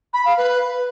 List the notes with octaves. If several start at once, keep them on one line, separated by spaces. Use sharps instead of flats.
B5
F5
B4